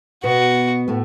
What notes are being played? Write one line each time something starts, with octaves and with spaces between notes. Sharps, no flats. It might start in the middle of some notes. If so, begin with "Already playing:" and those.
B2 B3 F#4
A2 A3